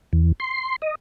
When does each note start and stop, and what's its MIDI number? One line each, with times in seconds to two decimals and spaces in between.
0.13 0.32 40
0.40 0.76 84
0.82 0.95 75